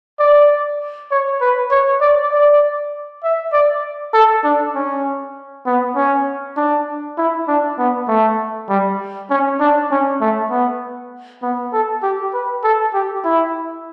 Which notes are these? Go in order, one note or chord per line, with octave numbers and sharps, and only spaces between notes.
D5
C#5
B4
C#5
D5
D5
E5
D5
A4
D4
C#4
B3
C#4
D4
E4
D4
B3
A3
G3
C#4
D4
C#4
A3
B3
B3
A4
G4
B4
A4
G4
E4